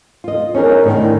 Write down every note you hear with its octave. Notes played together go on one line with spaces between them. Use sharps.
F4 D#5
C#4 D#4 G#4 A#4
A2 D3 D#3